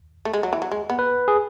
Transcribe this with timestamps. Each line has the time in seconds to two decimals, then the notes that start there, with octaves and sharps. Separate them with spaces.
0.25 A3
0.33 G#3
0.43 F#3
0.53 E3
0.62 F#3
0.72 G#3
0.90 B3
0.99 B4
1.28 G#4